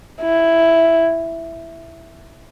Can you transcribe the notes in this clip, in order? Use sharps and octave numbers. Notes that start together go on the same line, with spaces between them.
E4